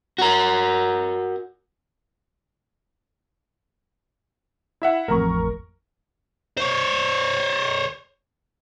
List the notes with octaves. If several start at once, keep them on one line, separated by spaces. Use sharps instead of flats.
F#4 A#4
E4 E5 F#5
A1 F2 A2 A#4 A#5 C#6
C5 C#5